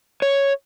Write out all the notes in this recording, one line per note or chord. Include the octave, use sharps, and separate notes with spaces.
C#5